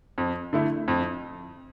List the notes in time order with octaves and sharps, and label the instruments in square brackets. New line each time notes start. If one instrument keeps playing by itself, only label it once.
[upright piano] F2
D3 A3 E4
F2